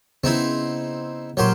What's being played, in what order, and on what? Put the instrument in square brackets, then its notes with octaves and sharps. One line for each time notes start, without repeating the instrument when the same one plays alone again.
[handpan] C#3 B3 [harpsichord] C4 D#4 E4
[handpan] A#2 A#4 C#5 [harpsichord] F#3 G4 C5